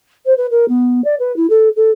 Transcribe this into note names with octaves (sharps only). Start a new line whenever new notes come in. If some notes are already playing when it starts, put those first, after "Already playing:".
C5
B4
A#4
B3
D5
B4
E4
A4
A4